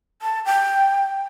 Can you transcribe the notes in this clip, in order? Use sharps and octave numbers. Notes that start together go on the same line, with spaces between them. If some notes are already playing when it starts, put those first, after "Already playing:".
A5
G5